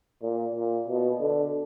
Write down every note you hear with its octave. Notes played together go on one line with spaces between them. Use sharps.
A#2
A#2
B2
D3